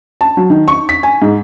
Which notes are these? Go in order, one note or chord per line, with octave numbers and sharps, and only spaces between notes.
A5
F#3
D#3
C#6
B6
G#5
G#2